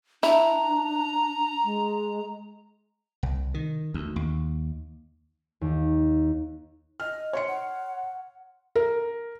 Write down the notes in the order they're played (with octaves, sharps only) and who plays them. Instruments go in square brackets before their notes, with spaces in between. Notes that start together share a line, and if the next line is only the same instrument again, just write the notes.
[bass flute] D4 [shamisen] E4 [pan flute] A#5
[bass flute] G#3
[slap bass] C2
D#3
D2
D#2
[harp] D#2
[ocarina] D#5 [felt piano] F6
[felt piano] C#5 C6 C#7
[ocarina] F#5
[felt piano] A#4